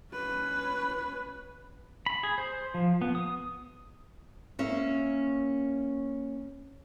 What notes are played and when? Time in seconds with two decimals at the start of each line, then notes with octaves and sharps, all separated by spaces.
0.13 C#4 B4
2.06 B5
2.23 G#4
2.38 C5
2.74 F3
3.02 B3
3.15 D#6
4.59 A#3 C#4 E5